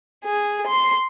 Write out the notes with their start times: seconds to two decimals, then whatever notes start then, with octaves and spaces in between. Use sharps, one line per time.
0.24 G#4
0.67 C6